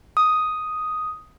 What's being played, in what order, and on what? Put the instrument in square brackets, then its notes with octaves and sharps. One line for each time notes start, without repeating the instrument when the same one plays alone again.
[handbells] D#6